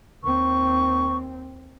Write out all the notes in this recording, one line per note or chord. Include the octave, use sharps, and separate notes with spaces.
D#2 C4 C#6